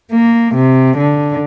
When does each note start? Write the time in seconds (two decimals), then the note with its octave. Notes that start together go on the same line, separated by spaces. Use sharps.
0.12 A#3
0.55 C3
0.97 D3